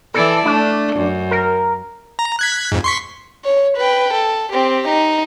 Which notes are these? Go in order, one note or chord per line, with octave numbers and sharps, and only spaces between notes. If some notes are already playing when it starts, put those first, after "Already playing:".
E3 E4 A4 D5
A3 D4
F#2
A#4
A#5
F#6 G#6 B6
F2 G#2
C6 C#6 B6
C#5
B4 G5
A4
C4 G4
D#4